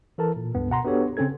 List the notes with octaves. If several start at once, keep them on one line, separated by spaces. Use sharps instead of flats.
E3 A4 A#4 A5
A#2
C#2 G2 B3
B2 F#5 A#5 C6
B3 D4 F#4 G4 A4 C#5
C#3 C4 C#4 A4 G#6